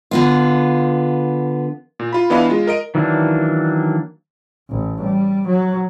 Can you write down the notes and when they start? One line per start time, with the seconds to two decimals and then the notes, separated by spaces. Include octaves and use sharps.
0.11 D3 B3 F4
1.99 A#2
2.13 F4 B5
2.30 E3 B3 D4 D#5 F5 B5
2.50 G#3 F4
2.67 A#4 D#5 D7
2.95 D#3 E3 F#3 A#3 D4
4.70 A1
5.01 G3
5.47 F#3